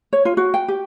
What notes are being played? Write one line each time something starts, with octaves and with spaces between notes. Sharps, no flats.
C#5
F4
F#4
G5
G4